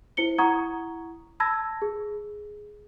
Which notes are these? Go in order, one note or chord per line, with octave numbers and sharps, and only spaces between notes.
E4 C5 C#7 G7
E4 F#5 A#5 C#6 D#6 G#6
A5 B5 E6 G#6 A#6
G#4